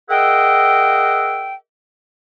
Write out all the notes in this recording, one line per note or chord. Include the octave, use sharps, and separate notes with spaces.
G#4 A#4 D#5 E5 F#5 G5